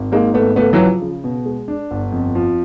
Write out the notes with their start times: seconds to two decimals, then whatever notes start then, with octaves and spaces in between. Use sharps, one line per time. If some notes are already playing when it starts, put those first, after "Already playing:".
Already playing: G#1
0.11 G#2 G#3 A#3
0.34 G#1 A3 B3
0.56 C#3 A3 B3
0.73 E3 F#3
0.79 F3
1.02 C#3
1.24 B2
1.46 G#3
1.68 D4
1.91 G1
2.12 F2
2.35 F3